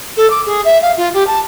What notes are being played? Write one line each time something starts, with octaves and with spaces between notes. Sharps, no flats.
A4
D6
G#4
E5
F5
F4
G4
A5